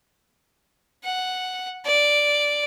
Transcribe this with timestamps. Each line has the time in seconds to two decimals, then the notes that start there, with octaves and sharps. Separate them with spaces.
1.04 F#5
1.85 D5